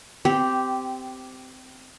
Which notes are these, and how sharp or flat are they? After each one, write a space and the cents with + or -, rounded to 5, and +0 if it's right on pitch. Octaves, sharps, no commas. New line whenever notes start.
C4 -20 G4 -5